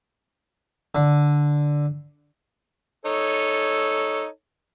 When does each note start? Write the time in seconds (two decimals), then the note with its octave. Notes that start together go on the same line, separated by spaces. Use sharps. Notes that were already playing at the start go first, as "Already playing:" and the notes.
0.95 D3
3.05 D#4 A4 C#5